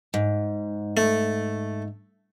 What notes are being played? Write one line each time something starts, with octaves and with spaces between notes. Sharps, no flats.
G#2
A3